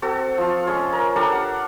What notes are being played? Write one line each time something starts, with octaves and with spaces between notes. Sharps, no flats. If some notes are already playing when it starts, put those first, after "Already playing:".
C4 F#4 A4
F3 F4
G#3 C#4 C6
A#4
D4 G4 A4 A#4
F#5